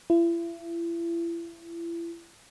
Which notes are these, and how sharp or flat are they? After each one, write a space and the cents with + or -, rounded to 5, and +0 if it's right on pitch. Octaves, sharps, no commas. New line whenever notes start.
E4 +35